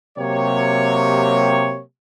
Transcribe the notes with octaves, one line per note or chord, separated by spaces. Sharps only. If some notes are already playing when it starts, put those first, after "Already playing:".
C3 F#3 A#3 G4 C#5